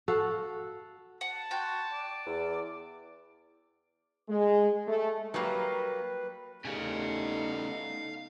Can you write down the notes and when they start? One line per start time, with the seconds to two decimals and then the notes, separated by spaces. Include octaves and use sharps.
0.08 F#4 A4 F5
1.21 F#5 A5
1.51 F#4 G5 C6 G6
1.92 D5
2.26 E2
4.28 G#3
4.88 A3
5.34 F#3 G3 A#3 B4
6.65 C#3 G3 A3 B3 D#4 F5 G#5